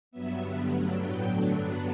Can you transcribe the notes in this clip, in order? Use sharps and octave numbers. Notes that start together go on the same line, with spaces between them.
G2 F#3 B3 E5
G2 D3 G3 B3
G2 F#3 A3 D4 F#5
A2 F#3 B3 G5
D3 F#3 A3 D4
G2 F#3 B3 D4 F#5